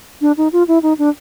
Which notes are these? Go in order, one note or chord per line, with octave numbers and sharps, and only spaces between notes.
D4
D#4
F4
E4
D#4
D4